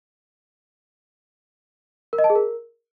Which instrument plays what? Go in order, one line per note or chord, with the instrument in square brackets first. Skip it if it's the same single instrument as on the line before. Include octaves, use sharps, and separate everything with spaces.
[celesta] A#4
D#5
A5
G#4
A#4